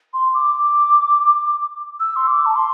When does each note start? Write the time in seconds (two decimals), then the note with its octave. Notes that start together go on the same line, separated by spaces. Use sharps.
0.14 C6
0.34 D6
2.00 E6
2.16 C6
2.27 D6
2.46 A5
2.56 C6